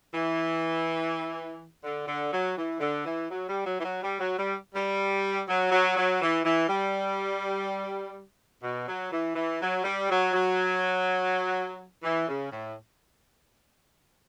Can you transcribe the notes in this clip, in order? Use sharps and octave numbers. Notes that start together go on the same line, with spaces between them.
E3
D3
D3
F#3
E3
D3
E3
F#3
G3
F#3
E3
F#3
G3
F#3
G3
G3
F#3
F#3
F#3
E3
E3
G3
B2
F#3
E3
E3
F#3
G3
F#3
F#3
E3
C#3
A2